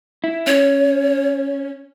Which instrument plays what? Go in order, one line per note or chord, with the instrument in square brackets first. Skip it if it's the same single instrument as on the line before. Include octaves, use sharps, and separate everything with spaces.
[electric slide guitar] E4
[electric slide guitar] C#4 [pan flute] C#5